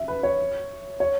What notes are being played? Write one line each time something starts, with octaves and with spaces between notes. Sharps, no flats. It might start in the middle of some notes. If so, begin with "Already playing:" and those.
Already playing: E5
B4
C#5
C#5